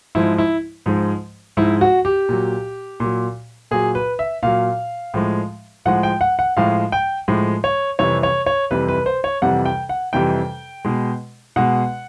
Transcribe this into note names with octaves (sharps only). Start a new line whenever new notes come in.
G#2 F3 G#3 E4
E4
G#2 F3 G#3
G#2 F3 G#3 E4
F#4
G4
A#2 F#3
A#2 F#3
A#2 F#3 G#4
B4
E5
A#2 F#3 F5
A2 F3 G#3
A2 F3 G#3 F#5
G5
F#5
F#5
A2 F3 G#3 F5
G5
A2 F3 G#3
C#5
F2 C3 E3 G3 C#5
C#5
C#5
F2 C3 E3 G3 B4
B4
C5
C#5
F2 C3 E3 G3 F#5
G5
F#5
F2 C3 E3 G3 G5
B2 G#3
B2 G#3 F#5